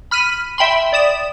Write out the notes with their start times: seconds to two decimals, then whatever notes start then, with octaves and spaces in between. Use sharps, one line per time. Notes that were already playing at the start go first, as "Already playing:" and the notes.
0.11 B5 F6 B6 D#7
0.58 E5 G5 B5 C6
0.93 D5 D#6 E7